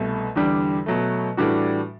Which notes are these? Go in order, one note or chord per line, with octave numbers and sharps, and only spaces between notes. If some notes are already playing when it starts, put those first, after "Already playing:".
Already playing: C2 B2 A3
E2 D3 G3 D4
B2 F#3 A3
A2 E3 G3 D4 F#4